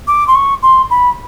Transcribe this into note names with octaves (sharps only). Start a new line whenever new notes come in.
D6
C6
C#6
C6
B5